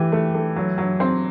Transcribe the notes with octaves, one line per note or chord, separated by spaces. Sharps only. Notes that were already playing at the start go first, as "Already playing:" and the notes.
Already playing: E3 A3 G4
A3
A3
F#3
F#3
C4